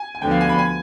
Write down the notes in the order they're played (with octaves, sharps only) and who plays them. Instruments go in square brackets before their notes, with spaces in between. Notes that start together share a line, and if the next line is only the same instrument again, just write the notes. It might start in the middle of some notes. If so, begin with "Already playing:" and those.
Already playing: [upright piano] G#5
G#5
[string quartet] D2 D3 F3 B3 [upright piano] G5
[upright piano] F5
G#5
B5
G#5